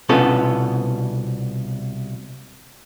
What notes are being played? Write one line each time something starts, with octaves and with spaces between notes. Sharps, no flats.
C2 B2 B3 C#4 F4 A4